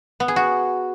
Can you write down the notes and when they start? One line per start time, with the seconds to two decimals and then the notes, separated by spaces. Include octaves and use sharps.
0.20 B3
0.28 G#4
0.36 F#4